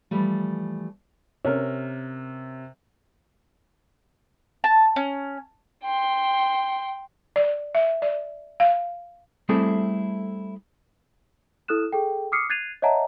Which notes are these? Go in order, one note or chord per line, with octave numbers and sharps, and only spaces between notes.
E3 F3 G3 A3
C3 C#4 A#4
A5
C#4
G5 C6
D5
E5
D5
F5
G3 A3 C4 E4 G#4 A4
E4 A4 D#6 F6 F#6 E7
G#4 A4 G5
D6 D#6 F6 C7 C#7
F#6 G#6 A6 C7 D#7 F7
C#5 D#5 E5 F#5 A5 A#5